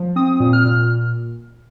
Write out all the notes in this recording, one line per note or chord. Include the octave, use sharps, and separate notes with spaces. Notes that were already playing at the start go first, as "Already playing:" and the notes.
Already playing: F3
C4 D#6
A#2
F6
A#2